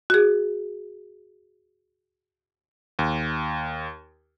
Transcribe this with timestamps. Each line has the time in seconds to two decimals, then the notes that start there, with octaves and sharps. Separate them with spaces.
0.10 F#4 G#4
2.99 D#2